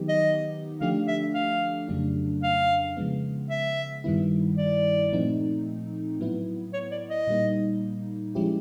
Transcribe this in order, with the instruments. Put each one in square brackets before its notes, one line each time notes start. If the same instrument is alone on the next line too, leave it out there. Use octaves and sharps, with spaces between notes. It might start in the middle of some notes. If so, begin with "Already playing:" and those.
Already playing: [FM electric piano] D#3 F#3 B3 D#4 G4
[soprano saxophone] D#5
[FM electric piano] D3 F3 A3 D4 G4 [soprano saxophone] F5
[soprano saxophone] E5
F5
[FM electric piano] F2 C#3 F#3 A3 D4
[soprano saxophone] F5
[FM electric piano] C#3 F3 G#3 B3
[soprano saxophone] E5
[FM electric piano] G2 D#3 G3 B3 E4
[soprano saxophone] D5
[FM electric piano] A#2 F3 A3 C4 D#4
A2 F#3 B3 E4
[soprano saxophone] C#5
D5
D#5
[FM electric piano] A#2 G3 A#3 D#4
F3 G#3 C#4 E4 G4